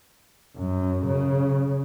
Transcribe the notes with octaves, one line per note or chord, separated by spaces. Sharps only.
F#2
C#3